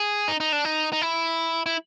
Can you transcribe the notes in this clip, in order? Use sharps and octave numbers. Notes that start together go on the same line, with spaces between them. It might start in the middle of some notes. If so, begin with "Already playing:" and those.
Already playing: G#4
D#4
D#4
D4
D#4
D#4
E4
E4